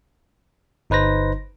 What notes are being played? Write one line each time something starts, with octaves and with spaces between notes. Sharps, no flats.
G1 D#4 B4 C5 A#6